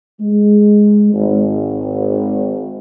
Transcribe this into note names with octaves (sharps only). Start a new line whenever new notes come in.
G#3
G#1